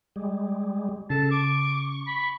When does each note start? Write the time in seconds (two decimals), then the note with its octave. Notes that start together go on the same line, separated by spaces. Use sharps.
0.16 G3 G#3
1.10 C#3 A4 A5
1.31 C#6 D6
2.07 B5